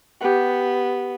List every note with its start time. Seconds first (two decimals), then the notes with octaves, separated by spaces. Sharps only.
0.21 B3 G4 F#5